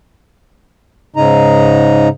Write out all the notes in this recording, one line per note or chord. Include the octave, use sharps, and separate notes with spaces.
G#2 C#3 D#4 A#5